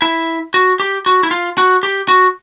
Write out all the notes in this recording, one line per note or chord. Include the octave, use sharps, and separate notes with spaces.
E4
F#4
G4
F#4
E4
F4
F#4
G4
F#4